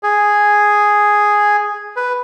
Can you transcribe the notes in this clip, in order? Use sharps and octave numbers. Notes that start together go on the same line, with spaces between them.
G#4
B4